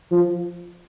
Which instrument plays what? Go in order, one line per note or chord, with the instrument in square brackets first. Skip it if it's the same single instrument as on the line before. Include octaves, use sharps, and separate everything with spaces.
[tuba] F3